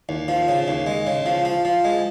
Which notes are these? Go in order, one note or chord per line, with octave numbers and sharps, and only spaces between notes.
D#2
F3
C#3
D#2
G#3
C#3
F3
F3
F3
G#3